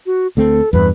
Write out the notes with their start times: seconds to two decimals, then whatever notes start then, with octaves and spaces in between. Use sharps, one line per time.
0.06 F#4
0.37 D2 A3 C4 A4
0.73 E2 G2 B4